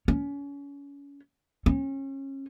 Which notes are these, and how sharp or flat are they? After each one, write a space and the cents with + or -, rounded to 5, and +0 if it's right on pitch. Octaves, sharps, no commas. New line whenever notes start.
C#4 +30
C#4 -30